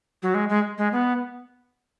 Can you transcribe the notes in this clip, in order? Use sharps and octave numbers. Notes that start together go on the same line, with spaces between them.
F#3
G#3
G#3
G#3
B3